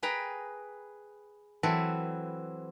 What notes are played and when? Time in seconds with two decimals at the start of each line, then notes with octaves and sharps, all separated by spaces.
0.03 G#4 B4 G5 A#5
1.63 E3 F#3 C4 A4 B4